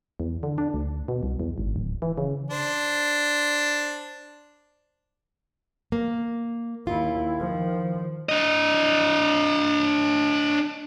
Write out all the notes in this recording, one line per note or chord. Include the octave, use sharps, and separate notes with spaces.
E2
D3
D4
D2
B2
C2
E2
G#1
D1
E3
C#3
D4 C5
A#3
D#2 E4 F4
D#3 F3
D4 D#5